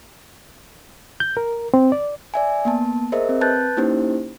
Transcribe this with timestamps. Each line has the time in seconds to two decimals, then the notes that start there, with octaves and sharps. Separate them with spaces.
1.20 G6
1.37 A#4
1.74 C4
1.92 D5
2.34 D5 E5 G#5
2.65 A#3 B3 A5
3.12 G#4 A#4 C5 D#5 E5
3.29 C4
3.41 B4 A5 F#6 G6 A6
3.77 A#3 C#4 D#4 E4 G4 C5